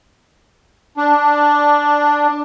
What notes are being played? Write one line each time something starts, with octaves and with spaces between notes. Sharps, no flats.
D4